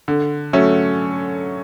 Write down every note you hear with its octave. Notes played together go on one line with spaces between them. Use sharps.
D3
F#3 A3 C#4